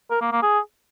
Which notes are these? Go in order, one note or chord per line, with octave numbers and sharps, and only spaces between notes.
A#4
A#3
A#3
G#4